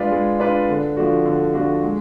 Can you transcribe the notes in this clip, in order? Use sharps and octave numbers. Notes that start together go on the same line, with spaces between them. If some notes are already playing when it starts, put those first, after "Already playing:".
Already playing: G#3 D4 F4 B4 D5
G#3
D4 F4 B4 D5
D3
F3 A3 D4 F#4
D3
F3 A3 D4 F#4
G#3